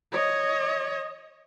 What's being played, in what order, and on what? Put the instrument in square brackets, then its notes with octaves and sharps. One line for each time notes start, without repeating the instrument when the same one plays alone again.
[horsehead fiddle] C#5 D#5